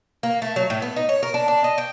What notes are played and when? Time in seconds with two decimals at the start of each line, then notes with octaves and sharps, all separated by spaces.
0.23 A#3
0.42 A3
0.56 F#3
0.70 A2
0.82 B3
0.96 D#4
1.09 C#5
1.23 A#4
1.34 D4
1.48 D4
1.64 D#5
1.78 G5